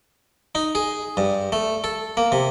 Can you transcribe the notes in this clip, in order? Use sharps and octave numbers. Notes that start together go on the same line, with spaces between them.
D#4
G#4
G2
A3
A4
A#3
C3